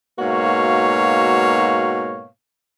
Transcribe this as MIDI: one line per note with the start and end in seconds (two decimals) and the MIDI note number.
0.19 2.27 44
0.19 2.27 47
0.19 2.27 58
0.19 2.27 66
0.19 2.27 73
0.19 2.27 77